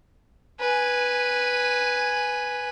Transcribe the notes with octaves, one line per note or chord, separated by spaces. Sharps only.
B4 G#5